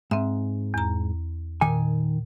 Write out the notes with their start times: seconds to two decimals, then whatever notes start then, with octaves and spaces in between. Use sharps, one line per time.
0.11 G#2 C4 E5
0.74 E2 A#5
1.61 A#2 D#3 G#5